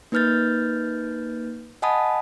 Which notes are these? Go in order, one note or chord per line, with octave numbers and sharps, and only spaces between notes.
A#3 D#4 B4 F6 G6 A6
D#5 F#5 G#5 A5 B5 D#6